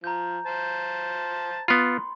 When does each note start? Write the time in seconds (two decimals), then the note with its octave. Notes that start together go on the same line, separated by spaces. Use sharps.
0.04 F3 A#5 G6
0.46 C5 A5
1.68 B3 F4 B5 C6